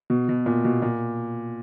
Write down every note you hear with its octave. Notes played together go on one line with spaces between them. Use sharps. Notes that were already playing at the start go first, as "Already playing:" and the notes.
B2
B2
A#2
B2
A#2